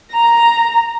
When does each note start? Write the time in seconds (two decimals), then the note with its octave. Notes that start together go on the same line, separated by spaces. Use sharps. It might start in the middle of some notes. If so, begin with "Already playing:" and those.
0.12 A#5